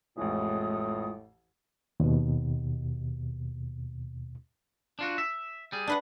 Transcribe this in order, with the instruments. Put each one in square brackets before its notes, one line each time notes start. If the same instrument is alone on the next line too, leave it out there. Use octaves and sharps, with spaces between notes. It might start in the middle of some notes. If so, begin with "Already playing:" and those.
[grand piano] A1 F2 E3 [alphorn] A2 [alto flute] G#3 [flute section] F4 D#6
[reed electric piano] D#2 B2
[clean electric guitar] D4 F4 F#4
E5
G3 G#4
[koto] D4 B4 F#5